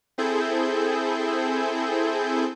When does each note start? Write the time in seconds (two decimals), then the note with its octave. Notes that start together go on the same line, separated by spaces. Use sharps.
0.18 C4 E4 G#4 A4 G6